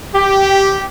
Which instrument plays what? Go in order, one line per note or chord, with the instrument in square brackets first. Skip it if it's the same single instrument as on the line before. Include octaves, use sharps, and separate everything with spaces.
[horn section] G4